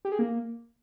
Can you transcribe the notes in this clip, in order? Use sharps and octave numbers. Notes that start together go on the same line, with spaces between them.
G4
G#4
A#3